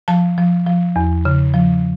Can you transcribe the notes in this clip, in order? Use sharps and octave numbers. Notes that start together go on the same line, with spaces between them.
F3 A5
F3
F3
E2
C#3
F3